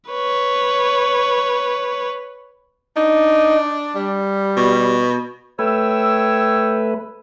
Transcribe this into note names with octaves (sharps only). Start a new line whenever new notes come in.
B4 C#5
D4 D#4
G3
B2
A3 B4 C#5 G5 E6